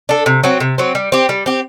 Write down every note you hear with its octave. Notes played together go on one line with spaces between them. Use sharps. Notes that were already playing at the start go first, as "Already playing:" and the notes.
D4 A4
C3
F#3 C4
C3
F#3 C4
G3
C4 G4
G3
C4 G4